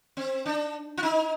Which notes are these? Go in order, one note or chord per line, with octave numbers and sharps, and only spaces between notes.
C4
D4
F4
D#4